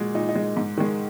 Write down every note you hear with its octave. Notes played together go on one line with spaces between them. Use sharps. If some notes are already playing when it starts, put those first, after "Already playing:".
Already playing: A#2 G#3 F#4
A#2 D#4
D#4
G#3
G#2
D#3 G#3